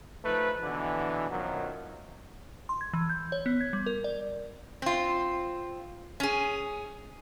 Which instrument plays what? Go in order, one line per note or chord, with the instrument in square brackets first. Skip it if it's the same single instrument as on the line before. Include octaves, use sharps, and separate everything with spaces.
[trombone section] F3 A3 D#4 B4
B2 D3 E3
F#2 B2 D#3 F3 F#3
[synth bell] C6
G#6
E3
G6
C#5
B3
G#6
G3
A#4
D5
[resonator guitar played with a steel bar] C4 F4
C#4 G#4